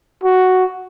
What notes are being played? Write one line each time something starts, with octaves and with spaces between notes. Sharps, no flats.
F#4